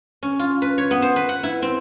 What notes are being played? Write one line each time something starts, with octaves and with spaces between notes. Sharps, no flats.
C#4
F4
B4
C#5
B3
C5
B4
F#5
E4
C4